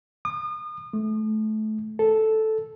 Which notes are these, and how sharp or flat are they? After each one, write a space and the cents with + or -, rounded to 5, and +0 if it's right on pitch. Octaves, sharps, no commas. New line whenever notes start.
D#6 -35
A3 -25
A4 -5